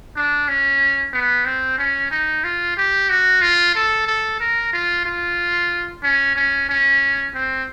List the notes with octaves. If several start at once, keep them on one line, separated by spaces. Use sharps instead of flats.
D4
C#4
B3
C4
C#4
D#4
F4
G4
F#4
F4
A4
A4
A#4
F4
F4
C#4
C#4
C#4
C4